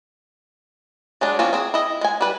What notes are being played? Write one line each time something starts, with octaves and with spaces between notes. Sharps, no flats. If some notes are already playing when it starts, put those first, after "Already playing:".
F#3 G#3 D4
F3 A#3 C4 C#4 F4
C4 G#4
E4 D#5
G#3 G#5
G3 B4